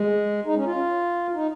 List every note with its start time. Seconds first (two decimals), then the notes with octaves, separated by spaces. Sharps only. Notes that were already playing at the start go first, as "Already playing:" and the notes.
Already playing: G#3
0.46 D#4
0.56 C#4
0.66 F4
1.34 D#4